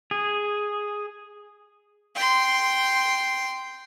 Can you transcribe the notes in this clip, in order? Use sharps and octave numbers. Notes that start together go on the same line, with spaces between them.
G#4
G5 C6